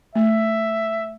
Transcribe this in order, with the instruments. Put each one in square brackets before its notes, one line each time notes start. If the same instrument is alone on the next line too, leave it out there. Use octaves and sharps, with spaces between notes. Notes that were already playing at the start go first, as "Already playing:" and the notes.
[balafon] A3 [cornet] E5